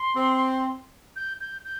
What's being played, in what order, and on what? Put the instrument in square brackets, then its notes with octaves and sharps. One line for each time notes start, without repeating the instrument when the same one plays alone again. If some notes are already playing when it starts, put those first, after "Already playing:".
Already playing: [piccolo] C6
[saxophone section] C4
[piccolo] G6
G6
G6